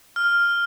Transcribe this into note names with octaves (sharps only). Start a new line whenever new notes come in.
F6